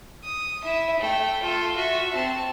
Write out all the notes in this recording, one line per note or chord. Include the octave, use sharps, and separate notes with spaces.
D#6
E4 E5
A3 G5
F4 A4
F#4 E5
C4 A5